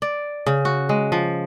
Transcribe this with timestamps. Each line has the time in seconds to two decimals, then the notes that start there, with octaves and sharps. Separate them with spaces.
0.02 D5
0.46 C#3
0.65 F#4
0.89 G#3
1.12 F3